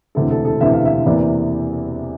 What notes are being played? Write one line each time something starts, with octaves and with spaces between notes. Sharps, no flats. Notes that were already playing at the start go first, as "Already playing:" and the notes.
E1 D2 C3 E3 A4
A4
A4
E1 D2 C3 E3 E5
F5
E5
E2 C3 E3 A#3 D5